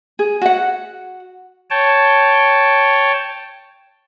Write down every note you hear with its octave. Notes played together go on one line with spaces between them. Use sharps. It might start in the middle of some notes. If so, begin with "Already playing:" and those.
G#4
F#4 F#5
C#5 G5 A5